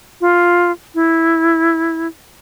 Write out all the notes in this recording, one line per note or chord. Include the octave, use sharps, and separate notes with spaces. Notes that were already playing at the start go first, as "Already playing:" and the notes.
F4
E4